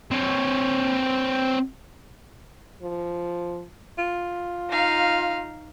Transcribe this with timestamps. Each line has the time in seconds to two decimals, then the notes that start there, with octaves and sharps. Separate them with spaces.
0.11 C4 C#5
2.82 F3
3.98 F4
4.70 D#4 F5